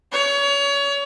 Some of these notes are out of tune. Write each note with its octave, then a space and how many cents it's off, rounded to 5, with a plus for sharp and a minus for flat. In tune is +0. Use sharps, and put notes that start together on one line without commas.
C#5 +30